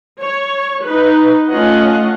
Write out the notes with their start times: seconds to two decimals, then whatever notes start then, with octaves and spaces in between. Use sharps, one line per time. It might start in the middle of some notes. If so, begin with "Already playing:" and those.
0.19 C#5
0.83 D#4 B4
1.48 A3 C#4 F4 D#5 F#5